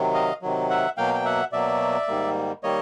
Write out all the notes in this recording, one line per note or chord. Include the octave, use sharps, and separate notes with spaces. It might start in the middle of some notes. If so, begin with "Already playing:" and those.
Already playing: C3 D#3 F#3
D#5 F5
C3 D#3 F#3
E5 F#5
B2 F#3 A#3 F5 G5
G5
E5 F#5
B2 F#3 A#3 D5 E5
G#2 D#3 G3 A#3
D#3 G3 A#3 C#5 D#5